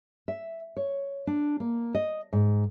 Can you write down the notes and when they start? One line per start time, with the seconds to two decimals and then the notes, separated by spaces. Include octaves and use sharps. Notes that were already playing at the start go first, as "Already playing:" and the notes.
0.28 E5
0.77 C#5
1.27 D4
1.60 A#3
1.95 D#5
2.33 G#2